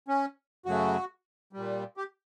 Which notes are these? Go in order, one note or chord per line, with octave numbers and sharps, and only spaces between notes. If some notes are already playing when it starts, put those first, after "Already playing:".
C#4
F#2 C#3 F#3 A3 F#4
A#2 G3
G4